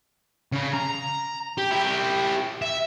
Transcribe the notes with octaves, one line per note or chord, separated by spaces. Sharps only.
C#3
A#5
G4
E4 G4
E5